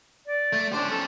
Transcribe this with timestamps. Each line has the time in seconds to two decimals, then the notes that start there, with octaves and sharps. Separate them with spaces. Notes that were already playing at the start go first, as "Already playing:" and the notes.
0.26 D5
0.53 A3
0.73 C#4 D4 C5
0.91 A4